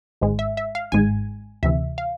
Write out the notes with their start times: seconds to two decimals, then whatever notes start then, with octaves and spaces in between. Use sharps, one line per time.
0.21 G#1 G#2 G#3
0.39 E5
0.57 E5
0.75 F5
0.92 G#1 G#2 G#3 G#5
1.63 D2 C3 E3 E5
1.98 F5